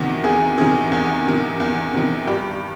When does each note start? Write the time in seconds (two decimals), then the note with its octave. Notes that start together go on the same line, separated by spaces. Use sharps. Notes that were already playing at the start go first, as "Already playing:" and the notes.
Already playing: E2 C3 D#3 F#4
0.24 E2 G#4
0.58 C3 D#3 G#4
0.92 E2
1.26 C3 D#3
1.60 E2
1.93 C3 D#3
2.27 G2 G4